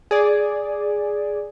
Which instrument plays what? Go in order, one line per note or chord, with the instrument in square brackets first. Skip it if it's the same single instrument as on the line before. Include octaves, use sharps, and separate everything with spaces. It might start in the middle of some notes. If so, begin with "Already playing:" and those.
[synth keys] G#4 D5